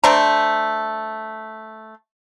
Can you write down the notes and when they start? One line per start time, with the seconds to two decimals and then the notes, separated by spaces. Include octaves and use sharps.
0.04 A3 D4 C5 A#5